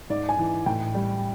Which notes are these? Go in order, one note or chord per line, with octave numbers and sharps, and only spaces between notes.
G#2 D5
G#5
E3
A2 G5
G3